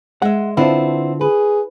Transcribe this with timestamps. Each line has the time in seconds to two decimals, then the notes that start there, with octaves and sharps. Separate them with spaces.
0.22 G#3 E5 F#5
0.57 D3 B3 C4 D4 E4 F4
1.21 G#4 B4